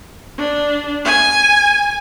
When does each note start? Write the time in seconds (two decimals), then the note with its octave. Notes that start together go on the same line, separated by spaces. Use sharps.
0.38 D4
1.05 G#5